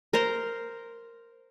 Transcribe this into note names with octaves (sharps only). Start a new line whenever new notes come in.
A#4 C5 A#5 C6